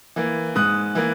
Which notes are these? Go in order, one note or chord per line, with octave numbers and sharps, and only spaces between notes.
E3 A#3
G#2 D#6 F#6
E3 A#3